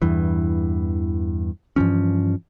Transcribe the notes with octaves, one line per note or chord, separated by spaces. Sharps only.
E2 G2 E3
G2 E3 F3 C#4